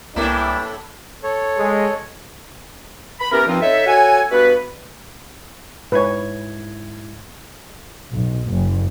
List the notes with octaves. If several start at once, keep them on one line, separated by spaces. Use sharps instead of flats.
C2 A2 E3 G3 A#3 D4 E4
A4 C#5
G#3
B5
E3 B3 C#4 G4 A#4
G2 F3 C4 D#4 F4
D#4 A4 C#5 E5
F#4 A4 C#5 G#5
G2 B3 F#4 B4
G#2 E4 B4 C#5 G#6
B1
F#1